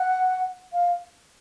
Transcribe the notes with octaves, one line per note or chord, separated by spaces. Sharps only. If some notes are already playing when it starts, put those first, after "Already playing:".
Already playing: F#5
F5